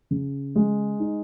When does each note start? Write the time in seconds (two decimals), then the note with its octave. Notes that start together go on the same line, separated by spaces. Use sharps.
0.11 C#3
0.56 G#3
1.00 D#4